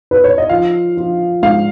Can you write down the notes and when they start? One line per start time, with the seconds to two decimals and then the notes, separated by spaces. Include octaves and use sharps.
0.11 B4
0.24 C#5
0.38 D#5
0.49 F3 F5
0.97 F3
1.43 G#2 F5